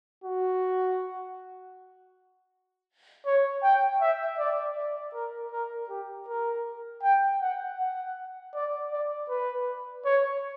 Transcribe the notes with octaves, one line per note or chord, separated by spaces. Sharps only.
F#4
C#5
G5
E5
D5
D5
A#4
A#4
G4
A#4
G5
F#5
F#5
D5
D5
B4
C#5